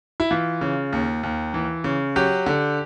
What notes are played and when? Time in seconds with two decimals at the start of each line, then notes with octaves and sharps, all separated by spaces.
0.20 E4
0.31 E3 F4
0.61 C#3
0.93 D#2
1.23 D#2
1.54 E3
1.84 C#3
2.16 F#3 G4
2.46 D3